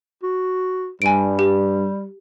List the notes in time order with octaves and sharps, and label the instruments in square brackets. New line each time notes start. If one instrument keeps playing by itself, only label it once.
[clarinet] F#4
[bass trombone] G2 [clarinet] G3 [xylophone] G#5 D7
[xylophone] G4